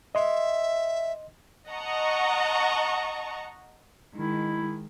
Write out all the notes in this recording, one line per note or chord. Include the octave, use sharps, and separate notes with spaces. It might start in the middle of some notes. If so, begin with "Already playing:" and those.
D#5 E5 C6
D#5 F#5 A5 A#5 C#6
D#3 G#3 E4